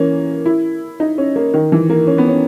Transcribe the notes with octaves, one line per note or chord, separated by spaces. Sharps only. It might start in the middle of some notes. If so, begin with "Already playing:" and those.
Already playing: E3 A#3 C#4
E4
D#4
C#4
A#3
D#3
E3
A#3
C#4
B3
C#4